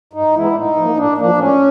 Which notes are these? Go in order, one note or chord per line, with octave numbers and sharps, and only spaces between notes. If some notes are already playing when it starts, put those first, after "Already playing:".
G2 D#4
E3 G#3 B3 E4
D4
A2 D#4
F3 A#3
A2 D4
F3 A#3 D4
A2 C#4